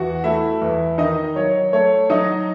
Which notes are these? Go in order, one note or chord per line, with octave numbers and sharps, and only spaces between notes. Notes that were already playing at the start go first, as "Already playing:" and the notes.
Already playing: E2 F#4 F#5
A3 E4 E5
E2
D#3 D#4 D#5
F#3 C#5
A3 C#5
F#3 D#4 D#5